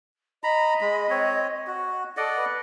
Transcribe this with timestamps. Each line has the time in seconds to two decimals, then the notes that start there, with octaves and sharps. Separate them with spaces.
0.44 D#5 A#5 B5
0.81 G#3 B5
1.10 C4 C#5
1.67 F#4
2.17 A4 D5 D#5 F#5
2.36 B4